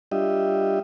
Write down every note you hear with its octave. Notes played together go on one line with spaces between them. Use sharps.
G3 D4 F4 G4 D#5 E5